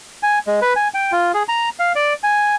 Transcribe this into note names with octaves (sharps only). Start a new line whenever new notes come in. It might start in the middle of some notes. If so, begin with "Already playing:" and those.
G#5
G#3
B4
G#5
G5
F4
G#4
A#5
F5
D5
G#5